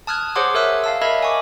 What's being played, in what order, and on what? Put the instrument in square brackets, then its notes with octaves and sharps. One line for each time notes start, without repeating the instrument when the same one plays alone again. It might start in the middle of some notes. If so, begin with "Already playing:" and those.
[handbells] A5 D#6 F6 F#6 G#6
G#4 C5 C#5 F#5 C6 D6
A#4 C#5 E5 E6 F#6
F5 A5 E6
A#4 D#5 E5 B5 E6 G#6
G#5 C#6 D6